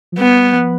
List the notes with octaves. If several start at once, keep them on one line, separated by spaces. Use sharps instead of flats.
F3
G3 B3
F3